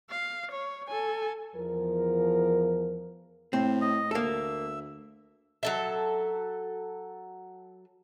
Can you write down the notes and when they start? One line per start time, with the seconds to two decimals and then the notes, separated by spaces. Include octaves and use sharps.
0.11 F5
0.52 C#5
0.88 A4 G#5
1.55 E2 F3 A#4
3.53 A2 C4
3.81 D#5
4.11 D2 A#3 A4 E5
5.63 F#3 A4 E5